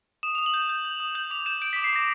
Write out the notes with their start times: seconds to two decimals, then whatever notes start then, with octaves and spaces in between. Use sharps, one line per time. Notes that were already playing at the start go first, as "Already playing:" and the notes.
0.23 D#6 E7
0.35 D#6 F7
0.46 F#7
0.54 G6
0.69 G6
0.85 G6
1.00 D#6
1.15 G6 F#7
1.30 D6 F7
1.46 G6 E7
1.62 G6 D7
1.73 B6
1.76 D6
1.84 C7
1.93 D6 A#6